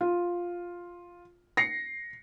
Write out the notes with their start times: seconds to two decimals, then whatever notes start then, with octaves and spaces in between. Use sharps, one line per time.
0.01 F4
1.57 A#6 C7 C#7